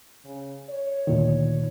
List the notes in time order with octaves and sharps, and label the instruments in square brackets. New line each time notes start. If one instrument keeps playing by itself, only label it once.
[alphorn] C#3
C#5
[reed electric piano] D2 A#2 D#3